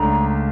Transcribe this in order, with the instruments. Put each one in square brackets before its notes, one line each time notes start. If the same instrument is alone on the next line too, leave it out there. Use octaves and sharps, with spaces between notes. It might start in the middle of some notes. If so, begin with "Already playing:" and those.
Already playing: [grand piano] C#2 C#3 A3 D4 [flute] A#5